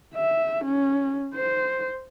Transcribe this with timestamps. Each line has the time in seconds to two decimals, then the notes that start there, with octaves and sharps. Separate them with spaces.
0.15 E5
0.65 C#4
1.34 C5